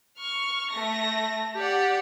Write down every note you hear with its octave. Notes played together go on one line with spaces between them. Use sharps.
C#6 F6
A3 A#6
G4 D5 F#5